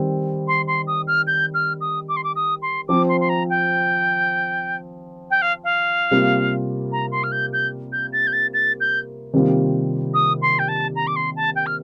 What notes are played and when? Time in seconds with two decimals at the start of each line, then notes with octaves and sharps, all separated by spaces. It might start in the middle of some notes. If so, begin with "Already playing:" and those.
Already playing: D#3 G3 C4
0.47 C6
0.67 C6
0.87 D#6
1.07 F6
1.27 G6
1.54 F6
1.80 D#6
2.08 D6
2.16 C6
2.23 D6
2.35 D#6
2.62 C6
2.88 F3 C4 F4 D6
3.08 C6
3.20 C6
3.29 A#5
3.49 G5
5.30 G5
5.41 F5
5.64 F5
6.11 C3 G3 A#3 F4
6.92 A#5
7.11 C6
7.23 F6
7.31 G6
7.53 G6
7.92 G6
8.12 A6
8.27 G6
8.32 A6
8.53 A6
8.80 G6
9.33 C3 D#3 G3 A#3 F4
10.14 D#6
10.41 C6
10.58 G5
10.68 A5
10.95 A#5
11.07 D6
11.15 C6
11.36 A5
11.55 G5
11.66 F6